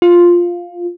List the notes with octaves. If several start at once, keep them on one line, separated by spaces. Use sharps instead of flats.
F4